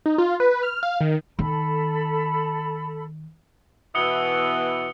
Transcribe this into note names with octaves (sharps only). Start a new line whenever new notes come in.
D#4
F4
B4
F6
F5
D#3
D#3 A4 B5
B2 E3 B3 D#6 C#7 G7